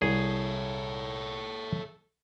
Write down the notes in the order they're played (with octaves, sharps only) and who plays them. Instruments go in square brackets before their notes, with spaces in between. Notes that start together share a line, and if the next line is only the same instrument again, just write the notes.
[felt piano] C2 [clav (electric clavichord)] G#4 [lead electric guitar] A4 C#5